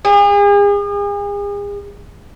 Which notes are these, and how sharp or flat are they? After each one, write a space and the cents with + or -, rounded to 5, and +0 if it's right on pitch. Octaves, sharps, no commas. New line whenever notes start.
G#4 -40